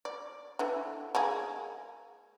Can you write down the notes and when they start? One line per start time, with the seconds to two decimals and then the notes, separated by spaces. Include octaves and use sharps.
0.05 D5
0.59 D3 E3
1.15 G#3 A#3 G#4